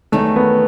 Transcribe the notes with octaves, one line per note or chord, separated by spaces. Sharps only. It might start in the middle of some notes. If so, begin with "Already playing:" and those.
E2 D#3 F#3 A3
B3